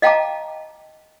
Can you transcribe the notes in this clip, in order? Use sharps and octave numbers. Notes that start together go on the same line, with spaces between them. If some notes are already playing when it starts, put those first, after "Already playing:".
D#5 F5 G5 A5 A#5 D6